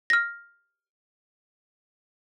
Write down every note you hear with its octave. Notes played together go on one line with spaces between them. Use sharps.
F6 A#6